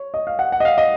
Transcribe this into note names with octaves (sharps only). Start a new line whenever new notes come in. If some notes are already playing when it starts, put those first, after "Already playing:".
Already playing: C#5
D#5
F5
F#5
F#5
D#5
F5
D#5